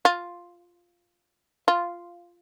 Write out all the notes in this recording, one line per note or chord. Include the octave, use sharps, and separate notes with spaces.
F4
F4